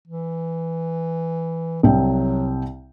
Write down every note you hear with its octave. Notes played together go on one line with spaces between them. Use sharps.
E3
C2 F#3 G5